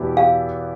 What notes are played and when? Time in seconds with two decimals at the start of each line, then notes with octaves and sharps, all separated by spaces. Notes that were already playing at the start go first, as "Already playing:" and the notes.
Already playing: E2 B2 B3 E4 G4
0.17 F5